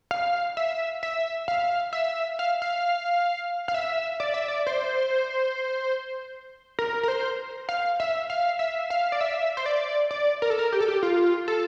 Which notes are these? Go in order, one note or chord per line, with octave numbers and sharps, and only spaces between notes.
F5
E5
E5
F5
E5
F5
F5
F5
E5
D5
E5
D5
C5
A#4
A#4
C5
F5
E5
F5
E5
F5
D5
E5
C5
D5
D5
A#4
A4
A#4
G4
A4
G4
F4
A4